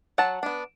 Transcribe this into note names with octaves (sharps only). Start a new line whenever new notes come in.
F#3 F#5 A5
B3 D4